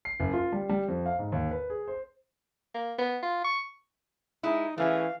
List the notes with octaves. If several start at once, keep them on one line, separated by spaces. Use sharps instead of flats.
C7
F#1
F4
G3
G3
F2
F5
G#2
D#2
B4
G#4
C5
A#3
B3
F4
C#6
G#3 D#4 E4
E3 A3 C#4 G#4 F5